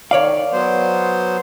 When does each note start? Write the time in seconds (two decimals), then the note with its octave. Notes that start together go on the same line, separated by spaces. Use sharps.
0.11 D#3 C#5 D5 F5
0.53 F#3 B3 C5